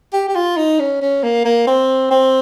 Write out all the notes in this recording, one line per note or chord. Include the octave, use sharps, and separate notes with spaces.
G4
G4
F4
D#4
C#4
C#4
A#3
A#3
C4
C4